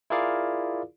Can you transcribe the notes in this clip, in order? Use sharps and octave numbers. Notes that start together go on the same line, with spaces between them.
E4 F4 G#4 A#4 D5 F5